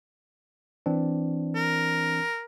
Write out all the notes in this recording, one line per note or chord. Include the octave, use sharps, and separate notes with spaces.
E3 C4 D4
A#4